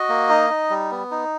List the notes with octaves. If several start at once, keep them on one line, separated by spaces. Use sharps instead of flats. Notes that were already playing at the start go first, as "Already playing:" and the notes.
Already playing: F#4 D#5
A#3
D#4
D#4
G3
B3
D#4